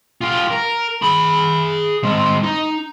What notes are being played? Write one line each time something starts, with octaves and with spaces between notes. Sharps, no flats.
F4 G4
A#4
G#4 B5
G#3 C4
D#4